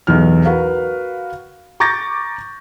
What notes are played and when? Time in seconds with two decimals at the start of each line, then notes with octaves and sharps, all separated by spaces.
0.07 B1 E2 F6
0.45 F#4 A#4 B4 F5
1.80 A#5 C#6 D6 G6 A6 A#6